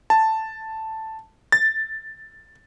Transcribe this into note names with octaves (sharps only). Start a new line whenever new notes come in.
A5
A6